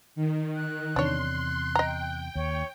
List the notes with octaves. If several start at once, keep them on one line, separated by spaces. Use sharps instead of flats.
D#3
F#6
E2 C3 D4 C#5 C6
D#5 G5 A#5
D#2 C#5